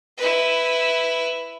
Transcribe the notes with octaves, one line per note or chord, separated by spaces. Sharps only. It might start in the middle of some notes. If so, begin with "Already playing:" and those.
E4 B4